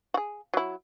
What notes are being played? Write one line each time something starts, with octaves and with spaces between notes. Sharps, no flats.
F#4 G#4
F#3 E4